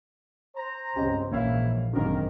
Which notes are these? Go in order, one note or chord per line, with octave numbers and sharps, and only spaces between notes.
C5 A#5
C#2 G2 C4 C#4 G4 D#5
A#1 G#2 E3 A#3 C#4 E4 C#5 F5
G#1 F#2 D3 D#3 G3 A#3 C4 A#4